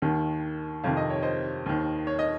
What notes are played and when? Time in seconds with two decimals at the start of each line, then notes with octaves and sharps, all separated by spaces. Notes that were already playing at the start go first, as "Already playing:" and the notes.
0.02 D#2 D#3
0.84 F2 C3 D#3 F5
0.97 D#5
1.10 C#5
1.22 C5 D#5
1.66 D#2 D#3
2.07 C#5
2.19 D#5